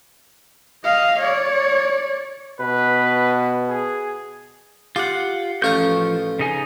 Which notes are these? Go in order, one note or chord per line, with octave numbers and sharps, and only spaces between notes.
D#5 F5
C#5 D5
B2 B4
G#4
F4 G4 F#5
A1 F3 F4 A#5 C#6 G6
C#3 D#4 G#5